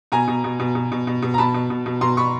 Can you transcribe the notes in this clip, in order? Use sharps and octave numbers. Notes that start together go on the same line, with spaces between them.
B2 G#5 A#5
B2
B2
B2
B2
B2
B2
B2
A#5
B2 A5 B5
B2
B2
B2
B2 A#5 C6
B2 B5 C#6